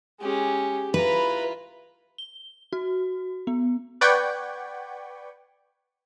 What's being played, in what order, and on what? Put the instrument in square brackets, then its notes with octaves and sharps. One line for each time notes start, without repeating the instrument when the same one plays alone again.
[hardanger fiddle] G#3 C#4 [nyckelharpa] G4
[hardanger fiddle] E4 F4 [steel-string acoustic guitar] B4 [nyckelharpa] A#5 B5
[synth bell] G7
F#4
B3
[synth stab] B4 D5 F#5 G5 C#6 G#6